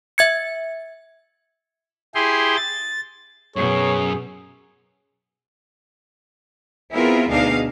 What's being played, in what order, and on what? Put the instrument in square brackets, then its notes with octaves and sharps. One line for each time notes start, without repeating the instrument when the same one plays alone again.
[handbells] E5 G#6 C#7
[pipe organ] E4 G4 G#4 C6
A6
[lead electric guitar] F#2 [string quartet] B2 [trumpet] G#4 [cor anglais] C#5
[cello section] B3 C4 E4 F4 G#4 A#4
D2 B2 D4 D#4 G#4 F5